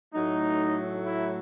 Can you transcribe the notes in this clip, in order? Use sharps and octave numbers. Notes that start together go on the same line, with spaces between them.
A2 F#3 A3 D#4
E4